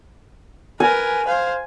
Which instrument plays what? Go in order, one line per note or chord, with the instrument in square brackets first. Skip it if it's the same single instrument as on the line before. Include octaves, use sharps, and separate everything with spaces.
[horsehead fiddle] A#4 B4 [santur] G#5
[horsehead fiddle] C5 F5